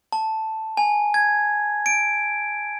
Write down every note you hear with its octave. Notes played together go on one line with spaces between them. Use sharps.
A5
G#5
G#6
D7